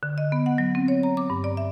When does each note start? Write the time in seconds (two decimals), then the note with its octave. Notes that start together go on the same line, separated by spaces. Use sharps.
0.03 D3
0.18 D#5
0.32 B3
0.46 F#5
0.58 F#3
0.75 C4
0.88 C#5
1.03 A#5
1.17 D6
1.30 G2
1.44 D5
1.57 E5